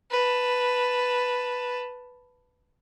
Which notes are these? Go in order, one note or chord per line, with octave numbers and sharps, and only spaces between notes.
B4 A5